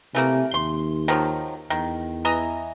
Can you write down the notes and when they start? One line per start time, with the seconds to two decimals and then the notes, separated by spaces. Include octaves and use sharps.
0.15 C3 E3 A3 A#3
0.54 D#2 C6
1.08 D#3 F3 F#3
1.70 E2 D#3
2.25 E3 D#5 A#5